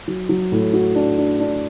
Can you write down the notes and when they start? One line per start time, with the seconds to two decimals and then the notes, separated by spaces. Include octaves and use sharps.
0.08 F#3
0.29 F#3
0.52 A2
0.73 F#4
0.95 D4
1.18 D4
1.40 D4